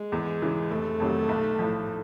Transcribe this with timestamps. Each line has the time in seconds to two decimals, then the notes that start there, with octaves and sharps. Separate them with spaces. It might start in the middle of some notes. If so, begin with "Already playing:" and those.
Already playing: G#3
0.12 E2
0.42 C#3 E3
0.71 F1 A3
1.00 F2 C3 D#3 F#3
1.29 B1
1.59 A2 F3